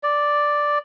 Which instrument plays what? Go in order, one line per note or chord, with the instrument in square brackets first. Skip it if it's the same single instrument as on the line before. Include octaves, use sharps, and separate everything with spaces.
[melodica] D5